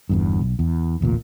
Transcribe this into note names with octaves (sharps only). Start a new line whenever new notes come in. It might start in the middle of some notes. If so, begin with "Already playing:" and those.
G1 E2 G2
B1
E2
E1 A1 D2 A#2